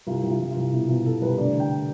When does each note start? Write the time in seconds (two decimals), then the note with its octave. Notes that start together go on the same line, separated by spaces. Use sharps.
0.07 C2 F4
0.23 C2
0.29 F4
0.40 C2
0.51 F4
0.56 C2
0.72 B2 E4
0.89 B2 F4
1.05 B2 A4
1.22 C2 B4
1.38 D2 D5
1.54 D3
1.60 G5